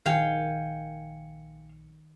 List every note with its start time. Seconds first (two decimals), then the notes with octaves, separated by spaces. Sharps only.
0.06 A#1 D#3 F5 G5 G#5 C#7